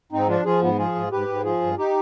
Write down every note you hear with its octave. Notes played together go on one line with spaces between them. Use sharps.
G#2 C4 D#4
F3 D4 F4
F3 F4 G#4
G#2 B3
F3 F4 G#4
G#2
G#2 G4 B4
G#2
F3 F4 G#4
G2
D#4 G4